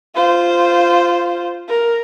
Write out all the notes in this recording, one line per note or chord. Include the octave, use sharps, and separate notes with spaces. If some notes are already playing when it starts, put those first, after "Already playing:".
F4 C5
A#4